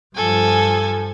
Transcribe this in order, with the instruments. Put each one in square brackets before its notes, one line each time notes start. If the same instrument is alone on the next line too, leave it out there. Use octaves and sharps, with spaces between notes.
[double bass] G2 F3 [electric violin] A4 G#5